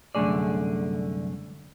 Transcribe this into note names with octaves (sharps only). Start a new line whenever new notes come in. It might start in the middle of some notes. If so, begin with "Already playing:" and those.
C2 F#2 D3 A3 G#4 D5